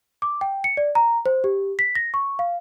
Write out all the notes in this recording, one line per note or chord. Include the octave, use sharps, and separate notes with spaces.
D6
G5
C#7
D5
A#5
C5
G4
B6
A#6
C#6
F5